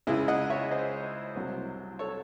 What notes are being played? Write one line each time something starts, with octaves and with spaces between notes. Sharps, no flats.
C#2 C#3 G#3 E4 G#4
D#5 F#5
C#5 E5
C5 D#5
C2 C3 F#3
A4 C#5